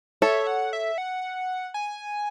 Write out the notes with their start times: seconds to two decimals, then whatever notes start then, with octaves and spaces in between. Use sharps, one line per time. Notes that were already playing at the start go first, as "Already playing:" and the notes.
0.22 A4 C#5 E5
0.47 F#5
0.73 E5
0.98 F#5
1.74 G#5